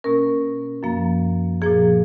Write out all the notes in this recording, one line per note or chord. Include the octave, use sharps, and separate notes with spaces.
B2 A#3 C#4 A#4
F#2 F3 A#3
A#2 F3 A#3 G#4